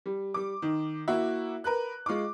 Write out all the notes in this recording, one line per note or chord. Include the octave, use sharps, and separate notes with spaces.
G3
G3 D6
D#3
A#3 E4 F#4 E5
A#4 B4 F#6
G#3 F4 C#6 D6